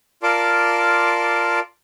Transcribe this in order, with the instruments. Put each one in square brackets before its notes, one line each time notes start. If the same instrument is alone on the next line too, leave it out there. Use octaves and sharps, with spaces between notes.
[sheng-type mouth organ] F4 A#4 D5 A5 C6 D6